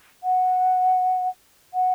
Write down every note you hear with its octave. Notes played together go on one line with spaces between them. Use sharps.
F#5
F#5